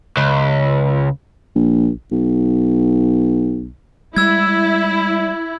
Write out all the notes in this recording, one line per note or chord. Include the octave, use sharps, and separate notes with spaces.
C#2
A#1
B1
G3 G#3 E4 E6 G#6